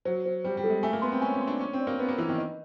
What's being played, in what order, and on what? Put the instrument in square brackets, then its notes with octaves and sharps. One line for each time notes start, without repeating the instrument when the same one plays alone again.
[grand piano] F#3 [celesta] C5
[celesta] C5
[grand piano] G3 [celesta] C5
[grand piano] G3
[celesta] A4
[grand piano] G#3
[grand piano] A3 [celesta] G#5
[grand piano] A#3
[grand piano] B3 [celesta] C6
[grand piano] C4
[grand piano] C#4 [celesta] G#5
[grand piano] C#4
[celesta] C6
[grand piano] D4
[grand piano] C#4 [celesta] D4
[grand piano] C4
[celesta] D5
[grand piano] A#3
[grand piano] B3 [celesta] B4
[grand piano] A#3
[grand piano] E3 [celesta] B4
[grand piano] D#3
[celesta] D#5